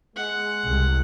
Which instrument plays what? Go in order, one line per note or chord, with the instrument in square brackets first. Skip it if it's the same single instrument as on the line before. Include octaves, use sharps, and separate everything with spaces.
[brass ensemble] G#3 [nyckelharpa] F#5
[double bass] C2